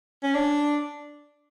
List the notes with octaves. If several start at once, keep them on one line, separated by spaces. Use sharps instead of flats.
C#4
D4